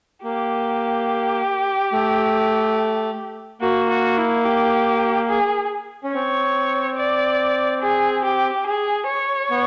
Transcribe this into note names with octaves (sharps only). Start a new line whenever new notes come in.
A#3 G4
A3
A#3 F#4
F#4
E4
G4
G#4
C#4
C4 C#5
D5
G#4
G4
G#4
C#5
B3